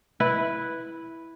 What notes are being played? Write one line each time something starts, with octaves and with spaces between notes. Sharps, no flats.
E4 B4